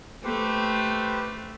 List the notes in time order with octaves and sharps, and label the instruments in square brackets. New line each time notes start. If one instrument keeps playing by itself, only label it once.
[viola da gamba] A3 [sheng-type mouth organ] G4 B4 C5